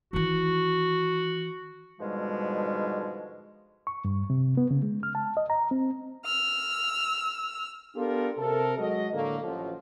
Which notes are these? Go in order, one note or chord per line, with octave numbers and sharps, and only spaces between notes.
D#3 E3 F#4
G#2 B2 D3 F3 G3 G#3
C#6
G2
C3
B3
C#3
G#3
F6
A5
D#5
A#5
C4
E6 F6
B3 D4 F4 G4 A4 A#4
C3 A4 A#4
F#3 G#3 F#4 D#5
A2 D3 A3 A#3
A1 F3 F#3